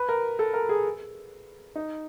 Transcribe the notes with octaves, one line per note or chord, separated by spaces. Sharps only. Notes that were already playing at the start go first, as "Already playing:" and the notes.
Already playing: B4
A#4
A4
A#4
G#4
D#4